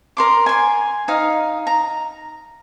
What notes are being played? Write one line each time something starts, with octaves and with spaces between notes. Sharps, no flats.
A#4 C6 D6
G#5 C6
D#4 F5
A#5